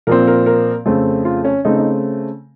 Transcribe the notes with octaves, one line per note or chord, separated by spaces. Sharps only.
A#2 F3 C4 A#4
A#4
A#4
F2 C#3 A3 C4
F4
C#4
C#3 A3 C4 D#4
D#4